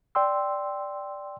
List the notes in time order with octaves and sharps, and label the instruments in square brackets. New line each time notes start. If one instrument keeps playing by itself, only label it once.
[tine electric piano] D5 G5 C6 E6